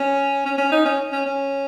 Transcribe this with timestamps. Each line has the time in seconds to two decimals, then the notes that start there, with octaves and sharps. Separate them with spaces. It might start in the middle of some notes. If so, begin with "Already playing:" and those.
Already playing: C#4
0.45 C#4
0.58 C#4
0.72 D#4
0.85 C#4
1.13 C#4
1.26 C#4